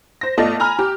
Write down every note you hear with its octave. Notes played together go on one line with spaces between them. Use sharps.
C5 A#6
A3 B3 F4 D5 D#5 A5
G#5 A#5 B5 F6
G4